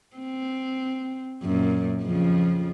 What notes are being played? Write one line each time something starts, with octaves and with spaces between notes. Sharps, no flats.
C4
F#2 A#2
F2 C#3 F3